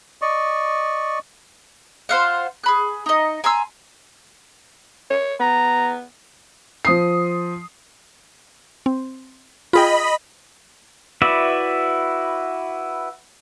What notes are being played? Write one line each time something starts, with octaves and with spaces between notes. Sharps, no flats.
D5 D#5 C#6
F4 C5 F5 F#5
G#4 B5 F#6
D#4 D#5
G#5 A#5 C6 E6
C#5
B3 A#5
F3 D#6 C7
C4
F4 G#4 D#5 G5 B5
E4 F#4 B4 D5 E5